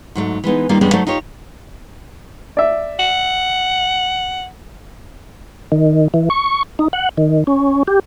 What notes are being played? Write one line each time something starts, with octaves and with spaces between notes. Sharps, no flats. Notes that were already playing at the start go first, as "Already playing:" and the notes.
G#2 F#3 G3 A3
E3 G#3 B3 D#4
D#3 G3 A#3 F4
E2 G3 G#3 C#4 D4 G#4
F#3 A3 D#4 C5 D5
D#4 F4 G4 C#5
D5 E5
F#5
D#3
E3
C#6
D#4
F#5
D#3
C#4
G4